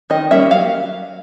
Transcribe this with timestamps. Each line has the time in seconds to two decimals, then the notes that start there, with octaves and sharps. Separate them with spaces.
0.10 D#3 D#5
0.31 G3 A#3 C#4 E5
0.51 F#3 F5